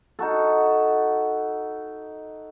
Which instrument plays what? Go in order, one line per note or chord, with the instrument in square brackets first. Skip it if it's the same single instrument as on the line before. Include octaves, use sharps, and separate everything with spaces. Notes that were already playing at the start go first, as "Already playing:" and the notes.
[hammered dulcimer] D#4 F#4 A4